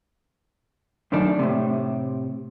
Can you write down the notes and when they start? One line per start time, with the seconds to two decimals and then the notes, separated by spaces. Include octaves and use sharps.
1.12 F#2 A2 D#3 A3 D4
1.39 A2 C3